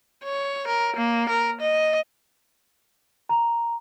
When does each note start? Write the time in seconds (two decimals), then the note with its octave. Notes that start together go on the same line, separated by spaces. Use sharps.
0.24 C#5
0.68 A#4
0.96 A#3
1.29 A#4
1.61 D#5
3.29 A#5